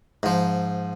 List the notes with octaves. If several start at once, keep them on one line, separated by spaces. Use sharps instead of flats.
G#2 F3